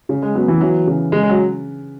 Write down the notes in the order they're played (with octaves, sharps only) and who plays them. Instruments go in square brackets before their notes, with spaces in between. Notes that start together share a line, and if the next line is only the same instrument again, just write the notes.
[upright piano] C#3
[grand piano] G#3
[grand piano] F#3 [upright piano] B3
[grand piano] E3
[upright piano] E3 [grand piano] F#3
[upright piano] C#3
[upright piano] C#3 [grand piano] G#3
[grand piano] G#3
F#3